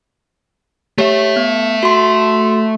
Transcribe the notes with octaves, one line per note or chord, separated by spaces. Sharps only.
A3 G4 C#5 E5
B3
F#4 C6